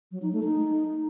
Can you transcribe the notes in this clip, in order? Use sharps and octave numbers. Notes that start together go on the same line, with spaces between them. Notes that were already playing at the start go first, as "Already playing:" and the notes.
F#3
D#4
A3
D#4